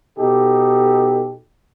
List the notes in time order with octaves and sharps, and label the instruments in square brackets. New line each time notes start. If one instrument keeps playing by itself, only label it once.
[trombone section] B2 D#4 G4 A4